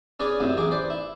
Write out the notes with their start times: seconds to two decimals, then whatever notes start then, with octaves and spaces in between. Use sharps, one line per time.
0.20 C#4 G#4 B4 C#5 D5 G#5
0.40 F#2 A2 C3
0.57 A1 G#4 D6
0.71 B4 C5 D5
0.90 E4